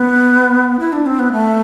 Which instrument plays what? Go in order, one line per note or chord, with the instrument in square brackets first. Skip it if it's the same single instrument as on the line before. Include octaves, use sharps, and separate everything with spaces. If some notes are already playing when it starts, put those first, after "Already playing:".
Already playing: [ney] B3
E4
D4
C4
B3
A3